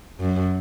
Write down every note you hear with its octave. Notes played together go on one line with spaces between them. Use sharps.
F#2